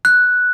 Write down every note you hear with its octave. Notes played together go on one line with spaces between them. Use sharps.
F#6